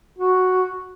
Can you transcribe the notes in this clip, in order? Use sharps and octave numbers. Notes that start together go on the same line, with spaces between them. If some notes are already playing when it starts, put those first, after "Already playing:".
F#4